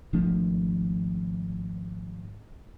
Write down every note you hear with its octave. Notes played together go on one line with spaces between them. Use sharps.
G#1 F3 A3 D4